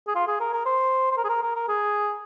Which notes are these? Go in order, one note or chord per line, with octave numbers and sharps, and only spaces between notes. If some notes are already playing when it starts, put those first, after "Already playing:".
G#4
F4
G#4
A#4
A#4
C5
C5
A#4
G#4
A#4
A#4
A#4
G#4